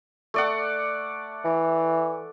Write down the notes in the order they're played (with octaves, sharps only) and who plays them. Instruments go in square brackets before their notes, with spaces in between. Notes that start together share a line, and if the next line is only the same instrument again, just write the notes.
[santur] A3 D5 F#5
[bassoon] E3